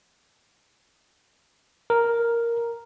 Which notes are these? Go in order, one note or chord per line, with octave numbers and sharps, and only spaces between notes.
A#4